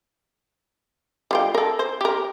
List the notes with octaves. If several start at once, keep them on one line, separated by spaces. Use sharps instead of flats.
G3 F4 G5
A4 A#4
C5
G4 A#4